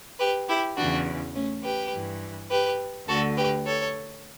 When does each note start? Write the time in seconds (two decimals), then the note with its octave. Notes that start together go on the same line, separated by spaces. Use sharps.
0.19 G4 B4
0.49 E4 G4
0.77 E2 C#3 E3 D4 F#4
1.35 A3 C#4
1.63 G4 B4
1.92 G2 E3
2.51 G4 B4
3.08 D2 D3 F#4 A4
3.37 G4 B4
3.66 A4 C#5